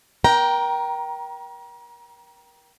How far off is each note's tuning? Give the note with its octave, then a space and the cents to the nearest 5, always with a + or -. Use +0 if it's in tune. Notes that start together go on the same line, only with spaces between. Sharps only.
A#4 +35 G5 -10 A#5 +15